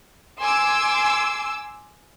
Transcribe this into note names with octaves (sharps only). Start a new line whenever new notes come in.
G#5 C6 D6 E6